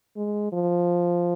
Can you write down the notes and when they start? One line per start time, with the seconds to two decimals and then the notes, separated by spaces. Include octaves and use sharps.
0.16 G#3
0.52 F3